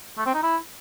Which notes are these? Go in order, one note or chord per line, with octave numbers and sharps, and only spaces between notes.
A3
C4
D#4
E4